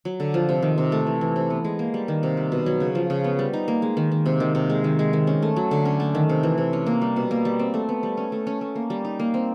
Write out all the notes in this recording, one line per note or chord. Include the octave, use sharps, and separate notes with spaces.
F#3
D3
F3
C3
D#3
C3
A3
E3
E3
C3
B3
G#3
A#3
G3
D#3
C3
G3
B2
F#3
C#3
F3
C#3
B3
G3
D#4
A#3
G#3
D#3
D#3
C3
D#3
C3
G#3
D#3
G#3
D#3
C#4
A3
F#3
D3
C#4
A3
D#3
C3
E3
C3
C#4
A#3
G3
B2
A#3
G3
C4
A3
B3
G3
C#4
A3
C#4
A3
A#3
G3
D#4
A#3
C4